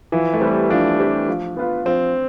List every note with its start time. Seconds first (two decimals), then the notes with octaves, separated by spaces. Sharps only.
0.12 E3 F3
0.34 A3
0.41 G3 C4 G4 B4
0.70 F3 D4
0.99 C4 G4 B4
1.28 F3
1.56 B3 F4 B4
1.85 F3 C4